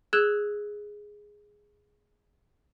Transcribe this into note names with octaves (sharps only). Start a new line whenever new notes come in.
G#4 E6 F#6 G#6 E7 G7